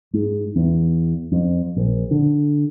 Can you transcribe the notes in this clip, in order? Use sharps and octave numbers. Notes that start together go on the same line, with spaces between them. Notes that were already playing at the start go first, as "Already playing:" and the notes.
G#2
E2
F2
A#1
D3